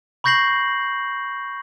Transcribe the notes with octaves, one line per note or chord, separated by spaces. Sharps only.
B5 C#6 G6 A#6 C7 F#7